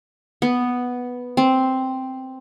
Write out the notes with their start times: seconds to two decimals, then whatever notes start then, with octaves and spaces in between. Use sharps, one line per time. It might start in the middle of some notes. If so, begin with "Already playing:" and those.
0.42 B3
1.37 C4